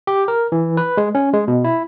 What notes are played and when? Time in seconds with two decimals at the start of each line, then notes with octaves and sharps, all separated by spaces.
0.07 G4
0.28 A#4
0.52 E3
0.77 B4
0.97 G#3
1.15 C#4
1.33 G#3
1.48 B2
1.64 E4